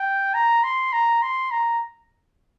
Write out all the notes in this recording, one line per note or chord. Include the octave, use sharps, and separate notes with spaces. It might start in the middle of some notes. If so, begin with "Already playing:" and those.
Already playing: G5
A#5
C6
A#5
C6
A#5